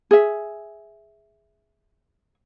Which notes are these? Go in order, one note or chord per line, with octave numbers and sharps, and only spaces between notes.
G#4 E5